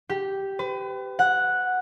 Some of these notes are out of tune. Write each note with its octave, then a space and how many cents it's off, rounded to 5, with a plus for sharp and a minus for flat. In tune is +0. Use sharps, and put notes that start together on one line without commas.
G4 -5
B4 +35
F#5 -5